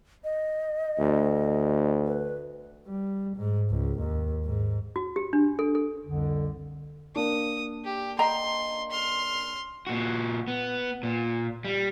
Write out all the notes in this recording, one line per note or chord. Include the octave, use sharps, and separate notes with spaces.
D#5
D2
B4
G3
G#2
C#2
D#2
G#2
F#4
G4
D4
A4
A4
C2 F2 D3
A#3 D4 D#6
G4
D#5 G5 A#5 C6
C6 F6
A#2 F#4
B3
A#2
G3